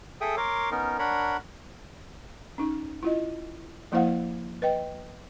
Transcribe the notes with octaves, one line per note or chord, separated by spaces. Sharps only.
G#4 A4 E5 G5 D#6
A#4 C#5 C6 D6
B3 C#4 D#4 A#4
D4 A#4 C#5 F#5 B5
C#4 D#4
E4 F4 D#5
F3 A#3 E4 C5 F5 F#5
B4 D#5 G5